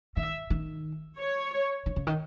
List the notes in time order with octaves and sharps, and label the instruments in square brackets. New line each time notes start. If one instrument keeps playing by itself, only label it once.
[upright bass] D#3 [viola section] E5
[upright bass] D#3
[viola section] C#5
[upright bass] D#3
C#3
D#3